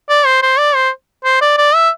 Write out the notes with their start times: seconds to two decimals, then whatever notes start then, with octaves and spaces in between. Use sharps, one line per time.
0.09 D5
0.26 C5
0.42 C5
0.59 D5
0.75 C5
1.25 C5
1.42 D5
1.58 D5
1.75 E5